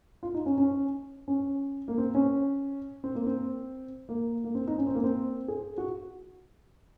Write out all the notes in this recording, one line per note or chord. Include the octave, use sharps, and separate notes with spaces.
F4
D#4
C#4
C#4
C#4
A#3
C4
C#4
C4
A#3
C4
A#3
A#3
C4
D#4
C#4
C4
A#3
C4
G#4
F#4